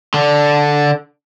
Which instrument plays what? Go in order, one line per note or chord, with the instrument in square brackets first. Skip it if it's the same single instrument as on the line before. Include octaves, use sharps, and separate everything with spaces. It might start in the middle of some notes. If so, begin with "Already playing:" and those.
[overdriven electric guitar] D3